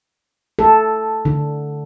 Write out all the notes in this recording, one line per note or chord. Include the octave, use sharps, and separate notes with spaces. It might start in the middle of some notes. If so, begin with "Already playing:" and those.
A4
D3